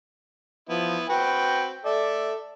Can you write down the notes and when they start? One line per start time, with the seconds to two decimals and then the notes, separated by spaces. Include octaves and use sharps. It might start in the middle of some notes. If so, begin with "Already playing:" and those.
0.69 F3 B3 E4
1.10 C4 F#4 B4 G5
1.85 A4 D5 E5